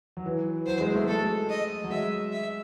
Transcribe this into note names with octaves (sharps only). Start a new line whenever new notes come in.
F#3
E3
F#3 C5
G#3
A3
G#3 A4
D#5
F#3
G#3 E5
E5